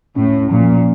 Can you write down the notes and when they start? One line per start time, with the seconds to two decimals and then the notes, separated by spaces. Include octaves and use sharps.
0.16 A2 C#4
0.51 A#2 F3